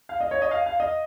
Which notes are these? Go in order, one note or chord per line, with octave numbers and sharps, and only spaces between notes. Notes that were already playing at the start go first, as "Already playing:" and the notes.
F5
D#5
C#5
D#5
F5
F5
D#5